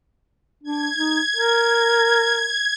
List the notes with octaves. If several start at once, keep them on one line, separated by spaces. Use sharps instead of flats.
D4 G#6
D#4
A#4